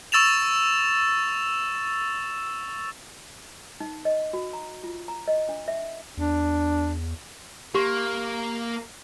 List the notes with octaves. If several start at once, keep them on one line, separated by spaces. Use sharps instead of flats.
C#6 E6 A6 E7 F7
D#4
D#5
F#4
A#5
F4
A#5
D#5
D4
E5
E2 D4
A#3 G4 C#6